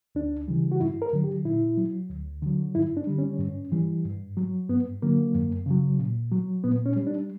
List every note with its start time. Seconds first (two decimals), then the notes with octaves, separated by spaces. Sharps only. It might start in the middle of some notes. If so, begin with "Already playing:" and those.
0.15 D2 D4
0.48 C#3 E3 G3
0.72 F#4
0.80 G2 E4
1.02 A#4
1.13 D3 F#3
1.24 G4
1.45 A#2 E4
1.78 F#3
2.10 D2
2.42 D3 F#3
2.75 G2 E4
2.97 D4
3.07 D3 G3
3.18 C#4
3.39 G2
3.72 E3 G3
4.05 G2
4.37 F#3
4.69 G2 B3
5.02 D3 F#3 A#3
5.35 F#2
5.66 C#3 F#3
5.99 A#2
6.32 F#3
6.64 A#2 B3
6.86 C#4
6.96 G3
7.07 D4